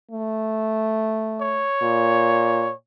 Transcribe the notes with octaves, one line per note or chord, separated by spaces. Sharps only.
A3
C#5
A#2